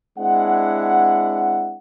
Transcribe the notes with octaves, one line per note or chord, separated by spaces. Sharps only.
G#3 C4 D4 E4 F#5